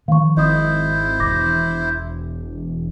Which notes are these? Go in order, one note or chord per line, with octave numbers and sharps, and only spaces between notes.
D#3 F3 G#3 F5 C#6
G#1 E4 C5 D#5 D#6
E1 D6 A#6